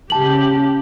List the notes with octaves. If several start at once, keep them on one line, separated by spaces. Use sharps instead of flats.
C#3 G4 A5 F#7